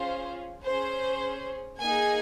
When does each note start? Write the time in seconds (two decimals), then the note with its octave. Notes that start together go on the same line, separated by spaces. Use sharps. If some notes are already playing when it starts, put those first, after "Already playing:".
Already playing: C#4 F4 G#4 C5
0.65 C#4 G#4 C5
1.81 A#3 D#4 G#4 G#5